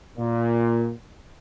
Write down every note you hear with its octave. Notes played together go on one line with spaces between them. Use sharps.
A#2